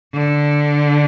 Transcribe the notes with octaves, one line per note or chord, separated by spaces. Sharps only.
D3